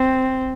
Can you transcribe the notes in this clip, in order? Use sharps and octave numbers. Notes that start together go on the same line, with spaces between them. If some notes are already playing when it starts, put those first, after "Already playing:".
Already playing: C4